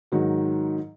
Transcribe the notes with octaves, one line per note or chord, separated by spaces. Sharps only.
G#2 D#3 F#3